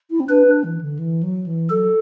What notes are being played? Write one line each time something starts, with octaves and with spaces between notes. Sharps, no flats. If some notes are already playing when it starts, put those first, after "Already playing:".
E4
C4
D4 B4
D4
E3
D3
E3
F#3
E3
F#3 A4